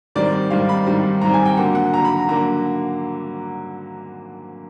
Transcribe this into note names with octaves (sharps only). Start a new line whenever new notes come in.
G#2 D#3 G3 C4 D5
G#2 D#3 G3 C4 F5
B5
G#2 D#3 G3 C4
G#2 D#3 G3 C4 A#5
G#5
G5
D3 F#3 A#3 F#5
F#5
D3 F#3 A#3 A#5
B5
A#5
D3 F#3 A#3 A#5